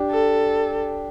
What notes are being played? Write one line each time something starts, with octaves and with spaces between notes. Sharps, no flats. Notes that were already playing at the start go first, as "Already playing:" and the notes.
Already playing: D4 G4
A4